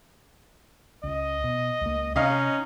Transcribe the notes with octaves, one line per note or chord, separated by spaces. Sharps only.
C#2 D#5
B2
C#2 A#3
C3 C#4 D#4 D#5 F5